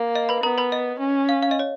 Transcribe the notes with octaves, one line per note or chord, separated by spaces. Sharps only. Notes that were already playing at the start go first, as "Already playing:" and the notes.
Already playing: A#3
D#5
B4 B5
B3 A#4 A#5
B4 B5
D#5
C#4
F5
F5
D#5
C#5